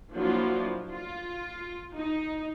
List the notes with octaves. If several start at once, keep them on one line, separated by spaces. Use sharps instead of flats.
F3 F#3 A#3 D4 E4 F4
F4
D#4